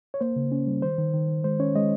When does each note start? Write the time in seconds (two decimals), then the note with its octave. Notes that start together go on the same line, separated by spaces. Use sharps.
0.14 C#5
0.21 A#3 C5
0.36 C#3
0.52 C#4
0.67 G3
0.82 D#3 C5
0.98 D#3
1.13 D#3
1.29 D#3
1.44 G#3 C5
1.60 C#4 C#5
1.75 G#3 D#5